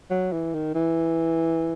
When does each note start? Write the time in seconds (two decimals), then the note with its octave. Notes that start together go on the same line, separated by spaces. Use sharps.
0.10 F#3
0.32 E3
0.54 D#3
0.75 E3